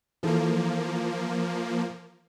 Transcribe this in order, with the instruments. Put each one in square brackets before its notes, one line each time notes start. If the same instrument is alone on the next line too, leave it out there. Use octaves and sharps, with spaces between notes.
[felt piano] E3 A4 [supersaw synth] F3 A#3